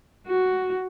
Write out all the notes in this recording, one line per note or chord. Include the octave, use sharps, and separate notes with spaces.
F#4